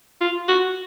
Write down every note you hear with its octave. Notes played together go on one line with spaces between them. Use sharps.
F4
F#4